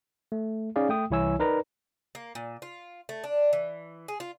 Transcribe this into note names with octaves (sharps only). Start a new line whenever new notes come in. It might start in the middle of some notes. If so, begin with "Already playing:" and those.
A3
C#4 D#4 G#4 D5 F5
A3 G5 D#6
C2 E3 E4 C#5 G#5 E6
D#4 A#4 B4 D5 A#5
A#3
A#2
F4
A3
D4
E3
G#4
F4